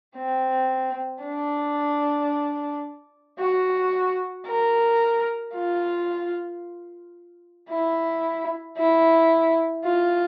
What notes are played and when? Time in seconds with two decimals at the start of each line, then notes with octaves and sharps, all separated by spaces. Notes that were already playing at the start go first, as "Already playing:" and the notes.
0.17 C4
1.24 D4
3.39 F#4
4.47 A#4
5.54 F4
7.70 E4
8.78 E4
9.84 F4